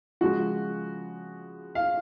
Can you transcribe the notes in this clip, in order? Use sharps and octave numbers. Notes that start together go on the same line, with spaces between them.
C#3 F3 G#3 F#4
F5